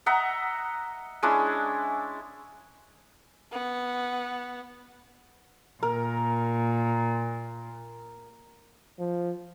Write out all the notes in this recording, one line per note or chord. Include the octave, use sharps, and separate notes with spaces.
D#5 E5 F#5 A#5
G#3 C#4 D4 E4
B3
A#2 A#4
F3